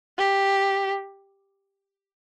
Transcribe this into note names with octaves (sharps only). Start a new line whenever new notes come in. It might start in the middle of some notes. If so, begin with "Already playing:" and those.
G4